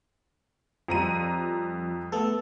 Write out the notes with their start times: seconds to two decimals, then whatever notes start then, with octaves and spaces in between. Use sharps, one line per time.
0.88 F2 F3 G3 A#5 D#7
2.12 A3 B3 A4